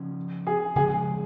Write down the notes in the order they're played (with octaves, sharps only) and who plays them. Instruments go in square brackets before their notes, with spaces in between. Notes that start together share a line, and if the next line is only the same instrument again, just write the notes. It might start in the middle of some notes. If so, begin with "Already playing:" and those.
Already playing: [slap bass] C#3 F3 C#4
[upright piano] G#4
[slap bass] C#3 F3 G#3 [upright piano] G#4